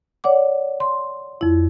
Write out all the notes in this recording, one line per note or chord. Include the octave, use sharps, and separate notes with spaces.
C#5 D5 F#5 D6
C6
F2 E4